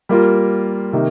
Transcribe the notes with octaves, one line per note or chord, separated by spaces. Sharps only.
G3 A#3 F4 A#4
C3 D#3 A#3 D#4